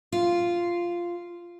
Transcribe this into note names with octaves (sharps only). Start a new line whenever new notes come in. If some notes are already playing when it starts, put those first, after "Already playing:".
F4